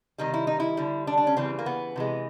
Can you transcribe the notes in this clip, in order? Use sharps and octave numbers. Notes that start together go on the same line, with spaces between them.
C3 D#3 G3 D#4
E4
D#4
E4
D3 G3
D4
D4
C#4
C#3 E3 G3 C4
A#3
B3
C3 E3 G#3